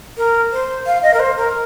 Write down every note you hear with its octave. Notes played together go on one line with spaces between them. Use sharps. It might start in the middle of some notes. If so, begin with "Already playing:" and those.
A#4
C5
F5
D#5
A#4
C5
A#4